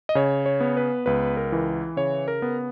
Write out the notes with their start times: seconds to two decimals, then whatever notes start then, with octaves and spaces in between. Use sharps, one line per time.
0.09 D#5
0.15 C#3 C#5
0.46 C#5
0.61 B3
0.77 B4
1.06 C#2 B4
1.37 A#4
1.52 E3
1.97 C#3 C#5
2.28 A#4
2.42 B3